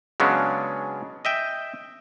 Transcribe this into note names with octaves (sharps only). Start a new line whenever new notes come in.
C#3 F#3 G#3 B3 C#4 D4
D#5 E5 G5